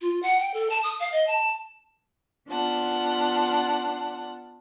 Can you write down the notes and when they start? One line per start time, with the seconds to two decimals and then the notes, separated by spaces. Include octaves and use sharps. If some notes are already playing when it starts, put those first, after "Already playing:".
0.01 F4
0.23 F#5
0.39 G5
0.54 A4
0.70 A5
0.83 D#6
1.00 F5
1.12 D#5
1.27 A5
2.48 B3 D4 F4 F#5 A5